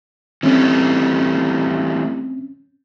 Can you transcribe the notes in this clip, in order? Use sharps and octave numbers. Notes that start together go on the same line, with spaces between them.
E3 G3 A3 C4 C#4